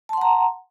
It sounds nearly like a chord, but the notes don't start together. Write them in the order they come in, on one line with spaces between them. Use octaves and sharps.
A5 C6 F#5 A#5